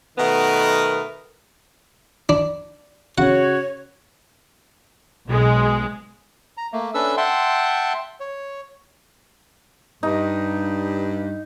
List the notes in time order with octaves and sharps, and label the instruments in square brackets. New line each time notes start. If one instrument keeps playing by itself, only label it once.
[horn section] B2 D#3 A3 B3 A#4 B4
[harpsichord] D4
[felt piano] C#3 [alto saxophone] F#4 [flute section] C#5 [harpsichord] F#5
[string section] B1 G#3
[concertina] A#5
A3 A#3
C#4 D4 A4 B4 E5 E6
E5 F#5 G5 A5 C6
C#5
[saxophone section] G2 [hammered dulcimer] D#4